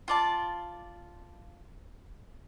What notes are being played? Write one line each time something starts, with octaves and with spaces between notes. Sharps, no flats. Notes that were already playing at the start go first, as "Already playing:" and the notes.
F4 D5 A5